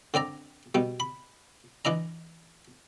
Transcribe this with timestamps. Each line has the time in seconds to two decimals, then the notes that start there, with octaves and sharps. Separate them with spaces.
0.14 D3 C4 D5 A#5
0.75 B2 G3
1.00 B5
1.85 E3 D4 D#5 A#5